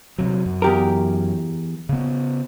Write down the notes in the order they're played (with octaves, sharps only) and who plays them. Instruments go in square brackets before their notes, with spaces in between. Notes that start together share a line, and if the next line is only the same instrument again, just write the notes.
[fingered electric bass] C3 F#3
F#2
[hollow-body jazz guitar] E2 G4 A#4
[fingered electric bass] C#3 B3